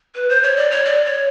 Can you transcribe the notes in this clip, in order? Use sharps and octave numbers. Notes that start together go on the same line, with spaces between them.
B4
C5
C#5
D5
C#5
D5
C#5